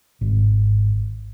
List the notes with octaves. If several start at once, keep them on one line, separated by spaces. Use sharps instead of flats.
G#1